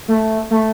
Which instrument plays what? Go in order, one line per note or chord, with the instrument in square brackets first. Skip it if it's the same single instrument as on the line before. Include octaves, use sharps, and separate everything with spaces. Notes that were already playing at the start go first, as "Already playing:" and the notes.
[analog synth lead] A3
A3